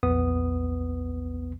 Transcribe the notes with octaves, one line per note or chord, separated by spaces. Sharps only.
A#1 E2 B3 D#6